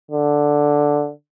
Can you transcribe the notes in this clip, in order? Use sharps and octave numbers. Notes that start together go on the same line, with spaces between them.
D3